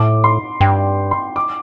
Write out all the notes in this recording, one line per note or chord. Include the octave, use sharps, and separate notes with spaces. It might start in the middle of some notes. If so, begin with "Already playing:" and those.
Already playing: A2 D6
C6
G2 G5
C6
D6